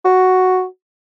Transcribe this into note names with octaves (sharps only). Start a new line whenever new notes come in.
F#4